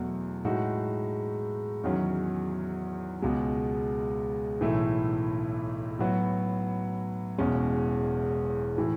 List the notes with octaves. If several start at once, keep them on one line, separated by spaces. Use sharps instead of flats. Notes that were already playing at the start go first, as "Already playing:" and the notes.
Already playing: E2 B2 F#3 A3
A2 G#3 D#4 F#4
E2 D#3 F#3 C#4
C#2 B2 G#3
B1 A2 E3 A3 E4
A2 F#3 B3 F#4
E1 E2 B2 G#3 C#4
A2 E3